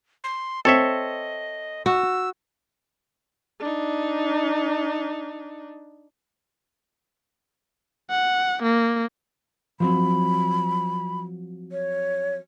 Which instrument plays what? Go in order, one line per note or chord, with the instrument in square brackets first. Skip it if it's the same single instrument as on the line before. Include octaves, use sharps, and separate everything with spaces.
[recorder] C6
[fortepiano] C4 [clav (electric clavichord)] A4 C#5 E5 [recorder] D#5
[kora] F#4 [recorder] E6
[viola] D4 D#4
[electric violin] F#5
A#3
[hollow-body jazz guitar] F3 F#3 C4 [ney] B5
[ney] C#5